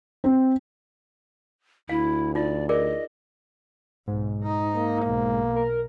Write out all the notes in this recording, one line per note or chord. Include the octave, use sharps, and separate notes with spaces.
C4
D2 E4 F5
D#4 F4 D5
G#4 A#4 D5 D#5
B1 G#2
D#4
A#3
B1
A#4